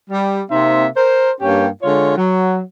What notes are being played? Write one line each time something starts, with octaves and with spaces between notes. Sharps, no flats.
G3
C3 A#3 C4 D#4 E5
A#4 C5
G2 A#3 C#4 G4 G5
D3 G#3 F4 C#5
F#3